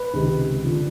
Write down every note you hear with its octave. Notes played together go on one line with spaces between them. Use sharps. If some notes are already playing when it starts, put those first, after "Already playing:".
Already playing: B4
C#2 C3 D#3 G#3
D3 F3